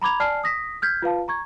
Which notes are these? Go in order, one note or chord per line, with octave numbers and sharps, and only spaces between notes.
A#5 B5 D6 G#6 F7
D5 G#5 A5 F6 C7
D#6 A#6 B6
F6 G6 G#6 B6
F4 B4 F5 A5
A#5 C#6 G#6